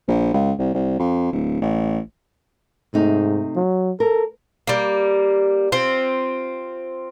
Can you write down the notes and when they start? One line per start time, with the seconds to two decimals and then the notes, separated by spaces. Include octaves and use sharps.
0.08 A#1
0.34 C#2
0.59 C2
0.74 C2
0.99 F2
1.32 D1
1.62 A1
2.94 G#2 C3 A3 D#4
3.56 F#3
4.00 A4 A#4
4.67 G3 A#3
5.72 C4 F4